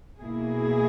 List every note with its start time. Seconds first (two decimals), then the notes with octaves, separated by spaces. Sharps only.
0.19 B2 A#3 E4 G#4